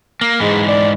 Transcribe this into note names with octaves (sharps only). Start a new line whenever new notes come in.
A#3
G#2 E3 G#3
D5